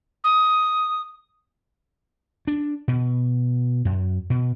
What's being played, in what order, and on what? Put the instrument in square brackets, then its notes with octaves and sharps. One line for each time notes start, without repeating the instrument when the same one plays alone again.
[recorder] D#6
[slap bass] D4
B2
F#2
B2